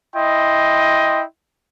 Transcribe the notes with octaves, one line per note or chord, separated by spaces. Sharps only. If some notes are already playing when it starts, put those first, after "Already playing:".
E4 D#5 G5 C6